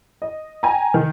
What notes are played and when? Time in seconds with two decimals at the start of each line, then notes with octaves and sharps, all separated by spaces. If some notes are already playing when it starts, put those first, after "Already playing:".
0.22 D#5
0.63 G5 G#5 A#5
0.94 D#3